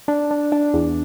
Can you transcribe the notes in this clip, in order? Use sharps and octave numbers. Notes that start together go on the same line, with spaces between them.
D4
D4
D4
E2